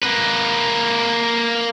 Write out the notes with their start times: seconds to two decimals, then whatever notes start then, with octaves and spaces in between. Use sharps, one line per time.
0.02 A#3 B4